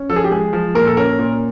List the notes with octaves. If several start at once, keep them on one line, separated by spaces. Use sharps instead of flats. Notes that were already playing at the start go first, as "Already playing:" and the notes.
Already playing: C#4
F3 A4
G#4
G4
G#3 G#4
F3
A#2 A#4
A4
C#4 A#4
A#2